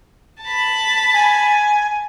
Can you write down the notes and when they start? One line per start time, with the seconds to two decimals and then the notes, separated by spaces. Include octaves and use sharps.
0.43 A5 B5
1.14 G#5